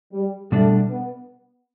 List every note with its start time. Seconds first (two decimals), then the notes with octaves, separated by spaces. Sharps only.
0.13 G3
0.52 B2 G3 A3 D4
0.91 B3